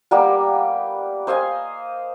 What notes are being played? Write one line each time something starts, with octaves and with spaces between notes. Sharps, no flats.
G3 A#3 B3 G4
C5 D#5 F5 G#5